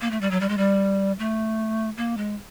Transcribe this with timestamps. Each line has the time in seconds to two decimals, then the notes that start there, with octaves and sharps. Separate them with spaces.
0.01 A#3
0.11 A3
0.21 G3
0.31 F#3
0.41 G3
0.49 G#3
0.58 G3
1.19 A3
1.97 A#3
2.17 G#3